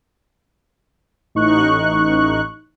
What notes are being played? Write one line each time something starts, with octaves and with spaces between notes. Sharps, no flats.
A1 D#4 C#6 F#6